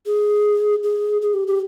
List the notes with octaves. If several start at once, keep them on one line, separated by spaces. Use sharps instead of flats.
G#4
G#4
G#4
G4
G4